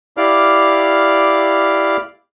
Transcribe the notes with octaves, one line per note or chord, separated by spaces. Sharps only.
E4 G4 D5 F5 D6 F6